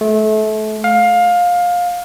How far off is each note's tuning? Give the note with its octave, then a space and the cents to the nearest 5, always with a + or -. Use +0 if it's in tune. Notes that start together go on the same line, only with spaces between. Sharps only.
A3 -30
F5 +20